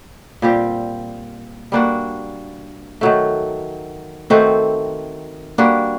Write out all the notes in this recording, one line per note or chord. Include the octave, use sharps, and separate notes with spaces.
A#2 G3 C4 G4
G3 A#3 D4 F#4
D#3 F#3 A3
D#3 A3 C4 F#4
G3 A#3 D4 F#4